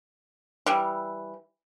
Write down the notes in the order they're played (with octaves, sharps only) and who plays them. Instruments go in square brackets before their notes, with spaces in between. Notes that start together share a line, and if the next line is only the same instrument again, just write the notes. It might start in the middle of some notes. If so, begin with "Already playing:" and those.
[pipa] E3 G3